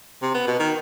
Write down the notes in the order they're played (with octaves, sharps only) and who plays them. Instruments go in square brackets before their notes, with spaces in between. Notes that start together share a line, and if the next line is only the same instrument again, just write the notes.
[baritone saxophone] C3
B3
B2
D#3